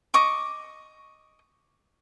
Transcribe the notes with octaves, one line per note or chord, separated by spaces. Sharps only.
D#5 C#6 D6